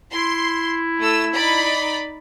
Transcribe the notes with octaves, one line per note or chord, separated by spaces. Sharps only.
E4 C6
A3 E6
D#4 D5 B5